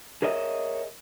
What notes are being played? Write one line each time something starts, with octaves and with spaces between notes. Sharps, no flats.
G#4 A#4 C#5 D#5 E5